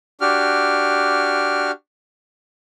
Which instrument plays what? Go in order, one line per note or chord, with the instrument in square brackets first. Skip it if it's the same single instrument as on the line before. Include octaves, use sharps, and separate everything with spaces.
[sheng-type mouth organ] D4 F#4 G4 F6